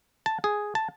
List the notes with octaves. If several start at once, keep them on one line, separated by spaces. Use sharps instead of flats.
A5
G#4
A5